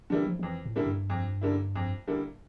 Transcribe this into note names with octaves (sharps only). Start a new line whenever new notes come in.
D3 E3 G3 A#3 E4
F3
F3
F2 E3
A2
D3 G3 A#3 E4
G2
F2
D3 G3 A#3 E4
F2
D3 G3 A#3 E4